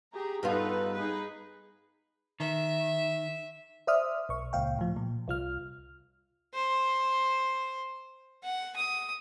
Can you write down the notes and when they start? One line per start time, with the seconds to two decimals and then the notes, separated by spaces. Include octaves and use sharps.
0.12 G4 G#4 A#5
0.43 G2 B3 D#4 F4 A4 B4
0.96 D#4 G#4 B4
2.40 D#3 E5
3.87 C5 D5 E5 D#6 F6
4.29 B1 C#6
4.53 C#2 A#2 F5 G5
4.79 A2 F3
4.96 A#2
5.28 C2 F4 F6
6.54 C5
8.44 F#5
8.76 D#6